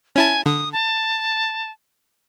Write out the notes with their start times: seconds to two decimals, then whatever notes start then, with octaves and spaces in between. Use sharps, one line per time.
0.16 C#4 E4 G#5 A5
0.46 D3 D#6
0.73 A5